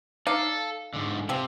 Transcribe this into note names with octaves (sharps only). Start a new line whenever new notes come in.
D#4 A4 D5 F5
G#2 D3
C3 F3 C4